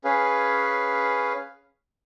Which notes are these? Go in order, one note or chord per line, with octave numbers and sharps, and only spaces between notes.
C#4 G#4 B4 F5